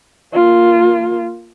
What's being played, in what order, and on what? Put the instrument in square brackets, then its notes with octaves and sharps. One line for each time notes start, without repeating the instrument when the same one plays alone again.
[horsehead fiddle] A#3 F4